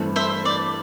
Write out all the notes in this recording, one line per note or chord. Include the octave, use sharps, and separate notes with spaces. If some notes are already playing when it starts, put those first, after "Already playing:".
Already playing: G2 E3 A3 C4
C5 E5
D5